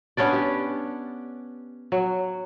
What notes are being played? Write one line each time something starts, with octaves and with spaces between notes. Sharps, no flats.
B3 C#4 D4 D5
G4
F#3